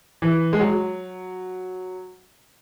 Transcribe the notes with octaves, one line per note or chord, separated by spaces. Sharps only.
E3
G#3
F#3